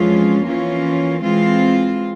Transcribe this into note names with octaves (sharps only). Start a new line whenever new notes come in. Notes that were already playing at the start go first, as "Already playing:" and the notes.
Already playing: F2 E3 G#3 C#4 F4
E3 A#3 C#4 F4
E3 G#3 C4 F4